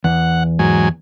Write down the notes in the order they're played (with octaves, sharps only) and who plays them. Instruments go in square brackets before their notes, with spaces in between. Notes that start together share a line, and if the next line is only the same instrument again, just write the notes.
[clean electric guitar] E2 [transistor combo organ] F#5
[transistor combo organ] G#2 F#3 G#5